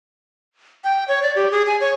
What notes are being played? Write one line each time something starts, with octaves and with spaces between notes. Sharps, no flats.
G5
C#5
D5
G4
G#4
G#5
C#5